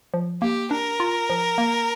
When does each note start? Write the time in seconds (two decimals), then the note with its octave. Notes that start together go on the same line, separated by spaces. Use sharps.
0.14 F3
0.42 A#3 G4
0.71 D4 A#4
1.00 F4
1.30 F3
1.58 A#3